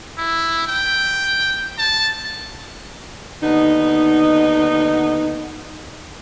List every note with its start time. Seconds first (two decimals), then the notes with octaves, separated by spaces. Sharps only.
0.18 E4
0.67 G5
1.78 A5
3.42 D#2 D3 B3 D#4